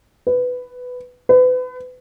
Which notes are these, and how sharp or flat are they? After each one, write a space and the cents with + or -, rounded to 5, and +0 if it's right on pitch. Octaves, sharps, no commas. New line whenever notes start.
B4 +10
B4 +35